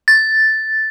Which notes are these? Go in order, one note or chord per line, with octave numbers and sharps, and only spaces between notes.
A6